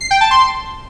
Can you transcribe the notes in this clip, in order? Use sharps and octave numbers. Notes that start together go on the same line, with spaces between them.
C7
G5
A5
C6